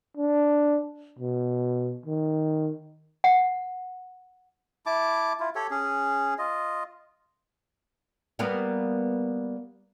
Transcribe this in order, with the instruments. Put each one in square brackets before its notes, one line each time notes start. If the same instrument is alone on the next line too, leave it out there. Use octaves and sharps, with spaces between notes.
[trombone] D4
B2
D#3
[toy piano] F#5
[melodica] E4 A5 D6
E4 F4
G4 A4 C#5
C#4 G#4
F4 D#5
[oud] G3 A#3 B3